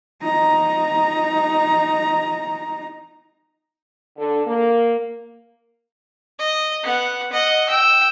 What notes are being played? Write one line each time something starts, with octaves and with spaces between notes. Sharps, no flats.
D#4 A#5
D3
A#3
D#5
B3 F#5
D#5 F#5
G5 E6